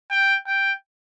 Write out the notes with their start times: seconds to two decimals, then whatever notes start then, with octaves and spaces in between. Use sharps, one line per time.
0.11 G5
0.47 G5